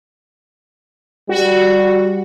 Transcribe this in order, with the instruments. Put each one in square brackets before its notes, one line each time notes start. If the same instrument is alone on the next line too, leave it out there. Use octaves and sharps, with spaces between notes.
[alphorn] G3 [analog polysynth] F#4